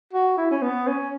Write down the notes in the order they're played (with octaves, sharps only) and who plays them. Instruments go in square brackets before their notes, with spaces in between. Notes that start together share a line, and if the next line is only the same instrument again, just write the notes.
[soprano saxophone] F#4
E4
C#4
B3
C#4